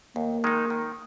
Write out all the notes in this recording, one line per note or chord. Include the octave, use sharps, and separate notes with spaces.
D#2 A#3
D#3 G#3 D#4
D#3